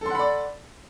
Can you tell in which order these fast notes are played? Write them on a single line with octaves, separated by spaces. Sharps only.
A4 C6 F#5 B5 D5